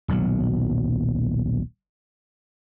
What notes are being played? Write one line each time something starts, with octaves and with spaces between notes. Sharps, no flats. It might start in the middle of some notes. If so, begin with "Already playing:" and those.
D#1 B1 F#3